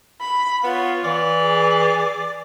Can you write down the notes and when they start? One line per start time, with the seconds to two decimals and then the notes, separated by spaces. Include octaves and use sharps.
0.21 B5
0.64 B3 F4 C#5
1.05 E3 D5
1.41 G#4